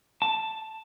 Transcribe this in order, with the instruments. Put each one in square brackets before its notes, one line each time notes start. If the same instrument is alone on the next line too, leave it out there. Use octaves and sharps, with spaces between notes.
[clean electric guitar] A5